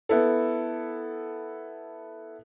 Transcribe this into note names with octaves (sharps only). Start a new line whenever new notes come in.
B3 E4 A4